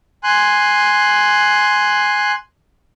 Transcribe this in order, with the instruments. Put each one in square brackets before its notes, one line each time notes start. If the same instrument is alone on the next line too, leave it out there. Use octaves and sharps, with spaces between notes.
[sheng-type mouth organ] G#5 C6 F#6